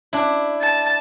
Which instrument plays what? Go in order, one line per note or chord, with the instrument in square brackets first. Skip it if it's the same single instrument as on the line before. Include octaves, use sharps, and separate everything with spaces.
[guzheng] D4 E4
[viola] A5